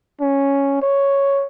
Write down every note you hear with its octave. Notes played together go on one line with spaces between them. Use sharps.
C#4
C#5